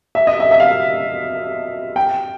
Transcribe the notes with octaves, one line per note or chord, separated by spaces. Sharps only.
E5
D#5
E5
E5
F5
G5